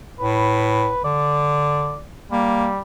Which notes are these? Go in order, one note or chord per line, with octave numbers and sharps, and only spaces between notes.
A2 B4
D3 D5
G3 A#3